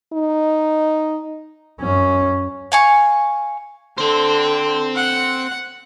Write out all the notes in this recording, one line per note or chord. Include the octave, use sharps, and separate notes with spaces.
D#4
F#2 C#4
F5 G#5 C#6
D3 C4 C5
F#5